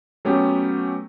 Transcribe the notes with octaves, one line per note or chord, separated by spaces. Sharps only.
F#3 A3 B3 C#4 G4